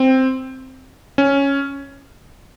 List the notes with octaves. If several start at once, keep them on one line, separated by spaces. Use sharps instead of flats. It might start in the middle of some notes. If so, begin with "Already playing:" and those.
Already playing: C4
C#4